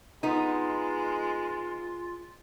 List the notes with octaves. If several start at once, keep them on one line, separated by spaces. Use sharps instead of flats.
G#3 B3 D#4 F4